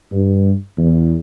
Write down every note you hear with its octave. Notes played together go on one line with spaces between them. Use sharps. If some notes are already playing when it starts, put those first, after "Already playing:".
G2
E2